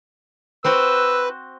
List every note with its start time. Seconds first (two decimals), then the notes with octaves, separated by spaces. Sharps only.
0.64 C4 F#4 B4 C5 E6